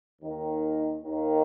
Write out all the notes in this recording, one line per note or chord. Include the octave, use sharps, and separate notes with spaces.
D#2 D#3
D#2 D#3